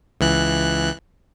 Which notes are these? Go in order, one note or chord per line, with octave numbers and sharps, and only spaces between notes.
C#2 E3 F#6